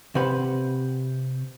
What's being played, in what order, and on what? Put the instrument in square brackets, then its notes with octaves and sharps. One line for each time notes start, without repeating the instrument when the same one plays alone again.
[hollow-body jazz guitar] C3 B4 C5 F#5 B5